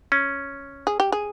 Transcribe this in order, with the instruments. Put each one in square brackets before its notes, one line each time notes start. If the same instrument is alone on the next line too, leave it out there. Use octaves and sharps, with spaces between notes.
[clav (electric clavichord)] C#4
[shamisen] G#4
G4
G#4